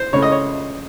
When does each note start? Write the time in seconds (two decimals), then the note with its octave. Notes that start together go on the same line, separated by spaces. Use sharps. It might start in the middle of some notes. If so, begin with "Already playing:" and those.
Already playing: C5
0.13 C#2 C#3 A3 C#5
0.22 D#5
0.32 C#5